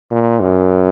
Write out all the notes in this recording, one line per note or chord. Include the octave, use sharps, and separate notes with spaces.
A#2
F#2